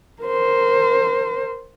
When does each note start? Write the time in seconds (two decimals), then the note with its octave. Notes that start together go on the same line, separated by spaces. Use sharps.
0.22 A#4 C5